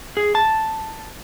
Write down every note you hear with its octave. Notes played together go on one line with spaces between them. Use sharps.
G#4
A5